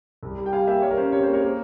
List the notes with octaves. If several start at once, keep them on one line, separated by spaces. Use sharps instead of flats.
C2
G3
G5
G3 F5 G#5
A#3 E5 G5
G3 C#5 F5
A#4
C#4 C5
C3 C#5
A#3 C5
A#4 C#5
A#3